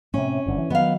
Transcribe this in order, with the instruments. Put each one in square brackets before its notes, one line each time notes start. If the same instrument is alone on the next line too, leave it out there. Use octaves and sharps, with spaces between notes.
[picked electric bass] A2 C3 [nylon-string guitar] C#4
[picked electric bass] F#1 G2 D3
E3
[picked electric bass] D#3 F#3 [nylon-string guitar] B3 F5